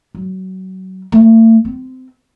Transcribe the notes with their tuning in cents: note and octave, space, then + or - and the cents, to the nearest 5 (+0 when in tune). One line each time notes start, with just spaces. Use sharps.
F#3 +25
A3 +40
C4 -25